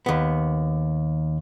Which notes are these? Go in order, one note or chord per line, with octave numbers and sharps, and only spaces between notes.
D#2 B3